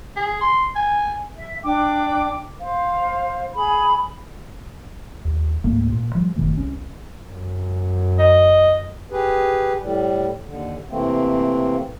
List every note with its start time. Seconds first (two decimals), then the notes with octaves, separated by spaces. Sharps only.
0.16 G#4
0.41 C6
0.76 G#5
1.36 E5
1.63 D4 G5 D6
2.60 C5 F5
3.54 G#4 B5
5.25 D#2
5.64 C#2 G#2 A3 A#3
5.89 A#2
6.15 F3 G3
6.36 F#1 B2 D#3 A3
6.57 C2 C#4
7.26 F#2
8.19 D#5
9.11 G4 G#4 B4
9.81 A2 G3
10.46 D#2 D3
10.90 C3 E3 A3 A#3 C4